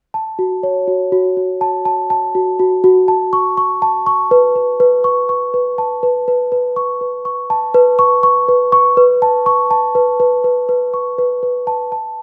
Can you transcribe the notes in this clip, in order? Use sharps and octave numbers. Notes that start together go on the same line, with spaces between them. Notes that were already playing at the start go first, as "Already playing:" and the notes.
A5
F#4
C#5
F#4
F#4
F#4
A5
A5
A5
F#4
F#4
F#4
A5
C#6
C#6
A5
C#6
B4
B4
B4
C#6
C#6
B4
A5
B4
B4
B4
C#6
B4
C#6
A5
B4
C#6
C#6
B4
C#6
B4
A5
C#6
A5
B4
B4
B4
B4
C#6
B4
B4
A5
A5